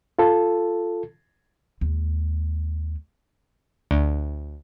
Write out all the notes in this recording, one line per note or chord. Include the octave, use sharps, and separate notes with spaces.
F4 A4
D#2 G#3
D2